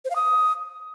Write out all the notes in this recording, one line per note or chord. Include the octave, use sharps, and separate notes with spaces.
C5
F5
D#6